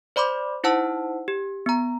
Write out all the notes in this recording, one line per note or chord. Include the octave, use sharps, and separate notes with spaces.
C5 D5 B5 C6 D6
D#4 E4 C5 F#5 A5 E6
G4
B3 A#5